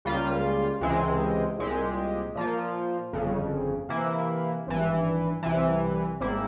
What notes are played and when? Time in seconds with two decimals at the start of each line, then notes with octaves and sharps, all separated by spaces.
0.05 C#2 C#3 G3 A#3 F4
0.81 C#2 C3 E3 G#3 C4
1.59 C2 A#2 G#3 C4 G4
2.35 A#2 F3 A#3 F4
3.13 G1 F2 C#3
3.89 C3 E3 A#3 E4
4.67 G#1 G2 E3
5.43 C2 C3 E3
6.20 G#1 G#2 G3 A#3 E4